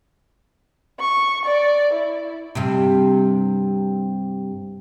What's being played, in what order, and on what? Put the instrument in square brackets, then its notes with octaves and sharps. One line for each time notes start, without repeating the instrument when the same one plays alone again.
[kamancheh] C#6
D5
E4
[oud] G2 C3